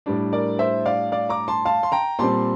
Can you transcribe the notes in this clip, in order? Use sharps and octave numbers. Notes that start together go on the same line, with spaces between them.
A2 G3 D4
A#4 D5
C5 E5
D5 F5
D5 F5
A#5 D6
A5 C6
F5 A5
C6
G5 A#5
A#2 G3 C4 A5 C6